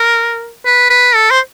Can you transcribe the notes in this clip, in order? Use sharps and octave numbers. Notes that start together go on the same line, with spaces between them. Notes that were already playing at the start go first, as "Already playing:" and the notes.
Already playing: A#4
B4
B4
A4
C5